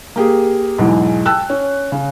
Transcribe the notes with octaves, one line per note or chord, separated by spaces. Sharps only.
A#3 G4 G#4
B1 E2 G#2 E3
G5 A5 E6 F#6
C#4
C#3